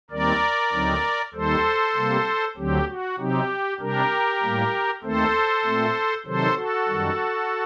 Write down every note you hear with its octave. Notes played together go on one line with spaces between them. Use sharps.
D#2 D#3 G3 C4 A#4 D5
D2 D3 F#3 C4 D#4
D#2 D#3 G3 A4 C5
C3 G3 A#3
D2 D3 F#3 C4 G4
F#4
C3 F#3 C4 D#4 G4
C3 G3 D4 G4 A#4
A2 G3 A#3
D#2 D#3 A3 C4 A4 C5
A#2 A3 C4
C3 D#3 F#3 A4 C5
F#4 A4
F#2 D#3 G3